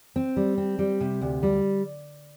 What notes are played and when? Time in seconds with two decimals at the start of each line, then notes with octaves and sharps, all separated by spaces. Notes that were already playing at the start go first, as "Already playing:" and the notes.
0.16 C4
0.36 G3
0.58 C4
0.79 G3
1.01 C3
1.22 D2
1.43 G3